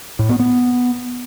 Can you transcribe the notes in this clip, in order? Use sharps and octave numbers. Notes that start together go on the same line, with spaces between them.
A2
B3
B3